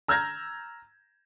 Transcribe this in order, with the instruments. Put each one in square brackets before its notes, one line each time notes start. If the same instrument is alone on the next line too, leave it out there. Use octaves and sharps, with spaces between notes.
[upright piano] A#5 E6 F6 G6 G#6 A#6